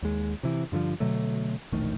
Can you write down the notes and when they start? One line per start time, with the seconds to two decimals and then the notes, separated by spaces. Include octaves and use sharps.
0.02 D#2 G#3
0.43 C3 E3
0.72 G2 D3 E3 F3
1.00 B2 D3 F#3 A3
1.72 E1 A#1 D#3 A3